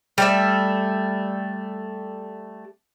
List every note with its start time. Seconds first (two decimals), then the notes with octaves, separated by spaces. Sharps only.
0.18 G3 A3 E5